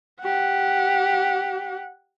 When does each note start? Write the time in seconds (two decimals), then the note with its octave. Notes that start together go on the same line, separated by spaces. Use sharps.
0.22 G4 F#5